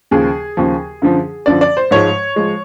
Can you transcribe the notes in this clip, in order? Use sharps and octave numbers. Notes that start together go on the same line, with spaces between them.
D#2 C#3 F3 G#4
D#2 C#3 F3
F#2 D3 F3
F#2 D3 F3 D5
D5
C5
G#2 F3 G#3 C#5
F3 G#3